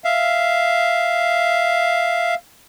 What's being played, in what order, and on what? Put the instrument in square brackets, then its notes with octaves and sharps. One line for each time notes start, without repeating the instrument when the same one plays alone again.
[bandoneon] E5 F5